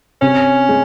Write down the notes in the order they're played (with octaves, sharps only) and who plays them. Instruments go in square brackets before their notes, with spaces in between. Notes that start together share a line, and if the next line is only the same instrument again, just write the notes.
[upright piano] C3 [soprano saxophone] C#4
[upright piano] G#3